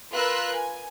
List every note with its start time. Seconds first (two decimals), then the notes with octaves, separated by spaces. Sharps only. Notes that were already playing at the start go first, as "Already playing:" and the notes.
0.14 F4 A#4 B4 E6 F#6
0.53 G#5